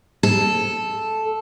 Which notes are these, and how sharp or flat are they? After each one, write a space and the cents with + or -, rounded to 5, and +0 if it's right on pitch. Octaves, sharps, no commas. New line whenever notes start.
A4 -5